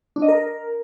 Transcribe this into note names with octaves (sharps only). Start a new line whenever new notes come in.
D4
D#5
A#4